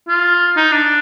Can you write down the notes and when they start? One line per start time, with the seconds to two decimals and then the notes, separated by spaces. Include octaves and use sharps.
0.08 F4
0.57 D#4
0.72 D4